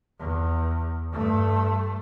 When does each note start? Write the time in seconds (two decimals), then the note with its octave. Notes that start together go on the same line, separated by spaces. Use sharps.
0.20 E2
1.12 G2 A3